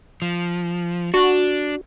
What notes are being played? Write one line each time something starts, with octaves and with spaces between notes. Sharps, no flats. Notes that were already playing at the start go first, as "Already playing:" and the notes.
F3
D4 F#4